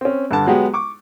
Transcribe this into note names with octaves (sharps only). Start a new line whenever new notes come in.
C4 C#4
G2 D3 A5
F#3 G#3 B3 G4
C#6 D6